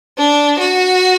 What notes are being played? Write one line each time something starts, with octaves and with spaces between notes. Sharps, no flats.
D4
F#4